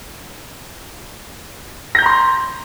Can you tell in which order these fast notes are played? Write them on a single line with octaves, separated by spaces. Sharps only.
A#6 G6 A#5 C6